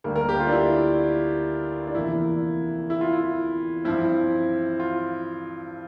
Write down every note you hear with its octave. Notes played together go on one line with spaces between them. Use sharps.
D2 D3 G3 A#3
A#4
G4
F4
D4
E4
D4
E2 C3 F3 A#3 E4
E4
F4
E4
G2 F3 C4 E4
F4